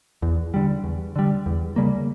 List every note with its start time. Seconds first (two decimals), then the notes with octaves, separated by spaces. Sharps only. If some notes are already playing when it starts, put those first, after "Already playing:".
0.22 E2
0.54 D3 G3
0.84 E2
1.16 D3 G3
1.46 E2
1.76 C#3 G3 A#3